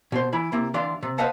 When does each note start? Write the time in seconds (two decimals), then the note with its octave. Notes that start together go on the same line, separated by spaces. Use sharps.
0.12 B2 C5
0.33 E3 E4 B5
0.52 C3 A#3 E4
0.74 D2 E3 D4 D5 F5 C6
1.03 C3
1.18 B4 C5 D#5 F5 F#5 A5